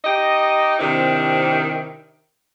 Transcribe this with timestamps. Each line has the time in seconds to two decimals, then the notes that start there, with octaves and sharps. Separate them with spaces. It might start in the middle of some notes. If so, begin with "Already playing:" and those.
0.04 D#4 G4 D#5
0.79 C3 D#3 C4 D4 E4